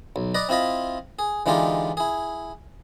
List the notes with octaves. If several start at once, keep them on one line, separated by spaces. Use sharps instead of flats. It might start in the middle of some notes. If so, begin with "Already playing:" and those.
B1
B4 D5 D#5 A#5
C4 E4 F4 D#5 B5
G#4
D3 E3 G#3 D#4 F4 G4
E4 G#4